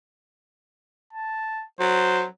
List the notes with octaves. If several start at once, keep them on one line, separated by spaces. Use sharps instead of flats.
A5
F#3 C5